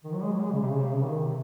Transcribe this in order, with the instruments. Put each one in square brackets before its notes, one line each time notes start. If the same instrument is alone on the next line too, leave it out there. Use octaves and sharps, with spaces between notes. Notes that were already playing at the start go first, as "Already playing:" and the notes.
[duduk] D#3
F#3
G#3
F#3
G#3
C#3
C3
C#3
C3
C#3
D#3
C3